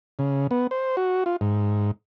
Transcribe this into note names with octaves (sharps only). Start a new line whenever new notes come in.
C#3
B3
C5
F#4
F4
G#2